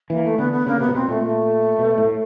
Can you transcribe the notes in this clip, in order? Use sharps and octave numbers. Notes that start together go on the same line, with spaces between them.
E3 A#3
A3
D3 B3
B3
C#3 A#3
C3 B3
A#2
B2 C4
A#2 A3
A3
B2
A2